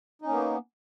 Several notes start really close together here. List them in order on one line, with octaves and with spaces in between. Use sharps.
D#4 C#4 A#3 B3